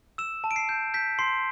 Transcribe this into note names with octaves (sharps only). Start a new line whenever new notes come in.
E6 E7
A5
D7
C7
G6
G6 B6
C6 C7